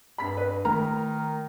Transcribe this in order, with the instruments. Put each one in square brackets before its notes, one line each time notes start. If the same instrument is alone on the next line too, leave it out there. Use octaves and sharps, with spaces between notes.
[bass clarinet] G2 [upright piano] B5 B6
[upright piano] B4
[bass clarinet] D#3 [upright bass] A3 E4 [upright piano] A#4 [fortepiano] A#5